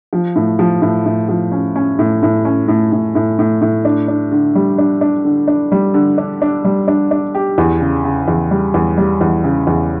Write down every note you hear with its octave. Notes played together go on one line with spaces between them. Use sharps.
F3
A2
F3
A2
A2
F3
C#4
C#4
A2
A2
C#4
A2
A2
A2
A2
A2
D4
D4
D3
G3
D4
D4
D3
D4
G3
D3
D4
D4
G3
D4
D4
G4
E2
C#3
C#3
E2
G3
E2
G3
E2
C#3
E2